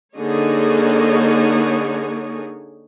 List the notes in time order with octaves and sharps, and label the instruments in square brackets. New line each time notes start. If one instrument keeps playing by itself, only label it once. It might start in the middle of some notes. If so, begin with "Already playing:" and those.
[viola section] D3 A#3 D#4 G#4 C#5